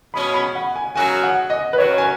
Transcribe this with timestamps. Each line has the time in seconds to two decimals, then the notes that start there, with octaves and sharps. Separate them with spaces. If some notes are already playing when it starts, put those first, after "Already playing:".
0.14 B2 G#3 C#4 B5
0.34 B5
0.55 F#5
0.76 G#5
0.96 F#2 C#3 F#3 D#4 F#4 G#5
1.23 F#5
1.50 D#5
1.73 B4
1.77 F#2 D#3 F#3 C#4 C#5
1.98 G#5